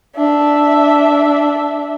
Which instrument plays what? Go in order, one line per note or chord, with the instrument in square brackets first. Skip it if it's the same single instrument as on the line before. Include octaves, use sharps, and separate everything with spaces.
[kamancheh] D4 E5